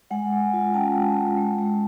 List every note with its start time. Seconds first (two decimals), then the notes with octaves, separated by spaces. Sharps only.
0.11 G#3 F#5 G#5
0.32 G#3
0.53 F4
0.74 C#4 G5 A5
0.95 G#3
1.16 G#3
1.37 G#3
1.59 G#3